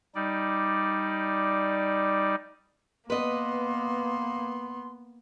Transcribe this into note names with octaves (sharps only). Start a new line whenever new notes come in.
G3 D#4 D5
A#3 B3 B4 D#5 C6